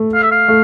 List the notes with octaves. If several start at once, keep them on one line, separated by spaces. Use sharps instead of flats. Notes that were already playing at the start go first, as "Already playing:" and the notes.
Already playing: A3
F5
E5
F5
A3